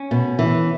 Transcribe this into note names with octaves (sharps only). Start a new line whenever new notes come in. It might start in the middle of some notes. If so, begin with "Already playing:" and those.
Already playing: C#4
B2
E3